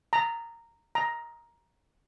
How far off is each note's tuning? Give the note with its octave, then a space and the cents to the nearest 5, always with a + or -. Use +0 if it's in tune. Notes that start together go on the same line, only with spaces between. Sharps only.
A#5 -10
A#5 +10